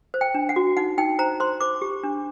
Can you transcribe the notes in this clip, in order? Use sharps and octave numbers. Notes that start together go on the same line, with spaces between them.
C5
G5
D4
F#5
F#4
D#4 F#5
D#4 G5
C5 A#5
C5 C6
C5 D6
G4
D4